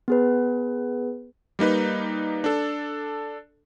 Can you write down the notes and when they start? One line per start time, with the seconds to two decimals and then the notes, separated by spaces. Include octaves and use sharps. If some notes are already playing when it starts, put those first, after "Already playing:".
0.08 B3 G#4 B4
1.59 G3 A#3 D#4 B4
2.44 D4 A4